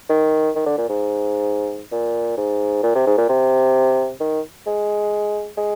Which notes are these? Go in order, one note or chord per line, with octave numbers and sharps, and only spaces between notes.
D#3
D#3
D3
A#2
G#2
A#2
G#2
A#2
C3
G#2
A#2
C3
D#3
G#3
G#3